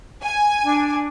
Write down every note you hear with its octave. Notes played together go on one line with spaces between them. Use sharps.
G#5
D4